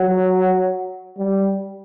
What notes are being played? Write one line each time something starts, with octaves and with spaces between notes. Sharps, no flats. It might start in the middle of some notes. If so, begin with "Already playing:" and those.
Already playing: F#3
G3